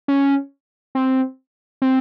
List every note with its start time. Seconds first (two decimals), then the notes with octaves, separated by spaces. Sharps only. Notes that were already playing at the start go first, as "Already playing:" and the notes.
0.08 C#4
0.95 C4
1.82 C4